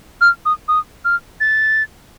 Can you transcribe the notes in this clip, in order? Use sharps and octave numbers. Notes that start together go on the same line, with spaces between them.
F6
D#6
D#6
F6
A6